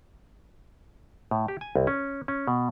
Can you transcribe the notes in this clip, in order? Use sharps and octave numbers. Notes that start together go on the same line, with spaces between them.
A2
G4
G#5
C2
C#4
C#4
B2